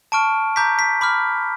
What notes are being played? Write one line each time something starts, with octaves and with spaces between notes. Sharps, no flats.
A5 C#6 F6 D7
A#5 D6 G6 B6
B6
B5 D6 F6